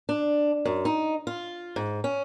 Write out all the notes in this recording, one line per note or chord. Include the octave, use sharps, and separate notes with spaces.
D4
F#2
D#4
F4
G#2
C#4